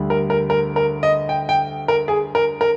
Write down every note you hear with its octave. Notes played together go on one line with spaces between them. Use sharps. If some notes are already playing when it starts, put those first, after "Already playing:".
Already playing: D2 D3 G3
A#4
A#4
A#4
A#4
D#5
G5
G5
A#4
G#4
A#4
A#4